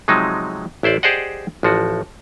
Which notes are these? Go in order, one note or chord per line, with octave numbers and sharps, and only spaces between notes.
C3 F3 F#3 G#3 D#4
A1 E4 C5 D5
G4 G#4 C5 D5 D#5 F#5
A1 F3 F#4